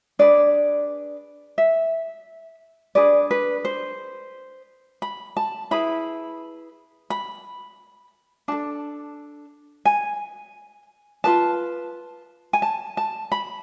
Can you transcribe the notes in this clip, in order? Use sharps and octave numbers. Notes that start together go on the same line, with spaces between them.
D4 G#4 B4 D5
E5
D4 G#4 B4 D5
B4
C5
B5
A5
E4 G#4 B4 B5
B5
D4 A4 A5
G#5
F4 G#4 B4 A5
G#5
A5
A5
B5